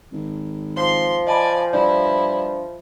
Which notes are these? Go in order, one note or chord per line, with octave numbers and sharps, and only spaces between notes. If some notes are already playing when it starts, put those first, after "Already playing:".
G#1
F3 C6
D5 D#5 G#5 A5 B5
G2 E4 D5